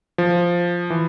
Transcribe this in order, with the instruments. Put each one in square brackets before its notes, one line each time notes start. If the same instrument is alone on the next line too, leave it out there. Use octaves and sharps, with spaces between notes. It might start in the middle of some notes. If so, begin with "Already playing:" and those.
[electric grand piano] F3
E3